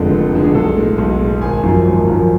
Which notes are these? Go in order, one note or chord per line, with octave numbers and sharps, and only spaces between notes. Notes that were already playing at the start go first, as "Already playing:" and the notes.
Already playing: F1 F2 D3 G#3 A4
F1
F2 D3 G#3
G#4
B1 A4
A2 G#3
B1
A2 G#3
G#1 G#5
F#2 F3
G#1
F#2 F3